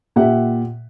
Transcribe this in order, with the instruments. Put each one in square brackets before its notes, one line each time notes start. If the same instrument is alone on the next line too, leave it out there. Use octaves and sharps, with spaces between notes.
[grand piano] A#2 G4 E5 F#5